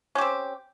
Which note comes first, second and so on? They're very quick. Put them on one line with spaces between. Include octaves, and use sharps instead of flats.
C#4 G4 C4